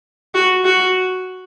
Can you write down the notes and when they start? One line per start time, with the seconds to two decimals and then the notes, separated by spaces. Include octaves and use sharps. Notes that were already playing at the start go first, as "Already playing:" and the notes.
0.35 F#4
0.65 F#4